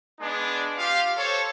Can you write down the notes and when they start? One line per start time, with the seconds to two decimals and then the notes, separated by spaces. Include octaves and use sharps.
0.20 G#3 B3 D4
0.78 F4 G4 F5
1.17 A4 C5 C#5